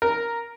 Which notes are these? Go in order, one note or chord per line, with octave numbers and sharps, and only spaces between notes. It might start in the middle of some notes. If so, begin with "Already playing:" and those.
A#4